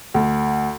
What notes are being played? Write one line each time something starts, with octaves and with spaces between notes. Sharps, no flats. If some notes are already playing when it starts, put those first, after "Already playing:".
D2